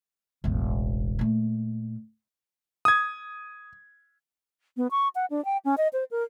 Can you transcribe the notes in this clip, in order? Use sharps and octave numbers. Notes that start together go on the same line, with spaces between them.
E1 A1
A#2 A3
D#6 G#6
B3
C#6
F#5
D4
G5
C#4
D#5
C5
A#4